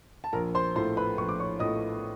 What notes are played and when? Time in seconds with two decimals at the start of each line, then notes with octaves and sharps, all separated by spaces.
0.24 A5
0.33 A#1 A#4 A#5
0.55 C5 C6
0.76 A2 F3 A3 C5 C6
0.97 B4 B5
1.18 A#1 C#6
1.29 D6
1.40 C#5 C#6
1.59 A2 F3 A3 D#5 D#6